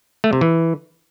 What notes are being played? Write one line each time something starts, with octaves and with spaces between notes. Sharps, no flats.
A3
C3
E3